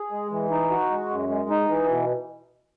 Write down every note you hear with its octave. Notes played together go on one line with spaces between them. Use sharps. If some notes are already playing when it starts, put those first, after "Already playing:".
Already playing: G#4
G#3
E3
D#4
F#4
G#3
F#2
G#3
D#4
E3
B2